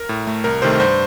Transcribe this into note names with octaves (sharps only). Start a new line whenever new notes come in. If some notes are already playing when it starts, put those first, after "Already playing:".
Already playing: A#4
A2
A3
C2 A#4
C3 D#3 A3 C5
G2 C5